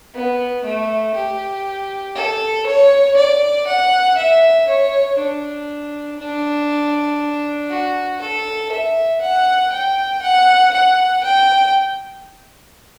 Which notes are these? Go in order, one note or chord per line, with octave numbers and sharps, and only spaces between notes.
B3
A3
G4
A4
C#5
D5
F#5
E5
C#5
D4
D4
F#4
A4
E5
F#5
G5
F#5
F#5
G5